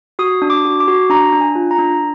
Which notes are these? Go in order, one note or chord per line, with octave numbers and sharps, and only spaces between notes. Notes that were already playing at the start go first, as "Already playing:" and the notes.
F#4 D#6
D4
D6
F#4
D6
F#4
D4 A#5
D4
G#5
F4
A#5
D4